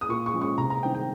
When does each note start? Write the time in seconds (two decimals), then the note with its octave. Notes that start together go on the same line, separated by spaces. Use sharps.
0.01 D#6
0.09 A#2 C#6
0.26 C#6
0.34 F3 G#3 C#4
0.41 C#6
0.58 C3 A#5
0.70 A#5
0.83 D#3 G3 C4 G5
0.95 G5